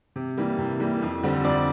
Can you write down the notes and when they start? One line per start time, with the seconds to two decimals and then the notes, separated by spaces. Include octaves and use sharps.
0.16 C3
0.37 E3 G3 A#3
0.58 C3
0.80 E3 G3 A#3
1.02 F2
1.23 D3 G3 C4
1.44 F2 D5